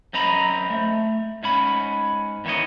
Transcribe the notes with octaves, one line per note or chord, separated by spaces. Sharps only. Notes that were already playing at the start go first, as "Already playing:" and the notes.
F#2 C4 D#5 A#5 B5
A3
G#2 C#4 B5
E2 D#3 E3 C#5 D#5